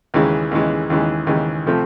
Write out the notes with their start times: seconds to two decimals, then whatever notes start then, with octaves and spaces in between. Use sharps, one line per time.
0.14 D#2 C#3 E3 G#3
0.51 D#2 C#3 E3 G#3
0.90 D#2 C#3 E3 G#3
1.27 D#2 C#3 E3 G#3
1.66 C3 F3 A3 C4